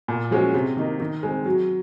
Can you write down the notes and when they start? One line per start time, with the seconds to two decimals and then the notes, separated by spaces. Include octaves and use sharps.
0.08 A#2
0.31 F3 G#3 C#4 F#4
0.54 C3
0.77 D#3 A#3 D#4
1.00 D#3
1.23 G#3 C4
1.46 F#3